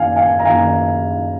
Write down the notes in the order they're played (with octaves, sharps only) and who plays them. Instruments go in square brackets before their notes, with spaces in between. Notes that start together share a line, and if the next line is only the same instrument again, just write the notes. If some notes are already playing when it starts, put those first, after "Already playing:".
Already playing: [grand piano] F#2 D#3 A#3 F5 G#5
F5 G#5
A#5
F#2 D#3 A#3 F5 G#5